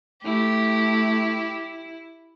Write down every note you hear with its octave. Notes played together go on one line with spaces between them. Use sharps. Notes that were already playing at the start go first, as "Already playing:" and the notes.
A3 E4 G4